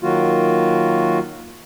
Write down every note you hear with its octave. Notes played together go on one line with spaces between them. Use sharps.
D#3 F#3 A#3 F4 F#4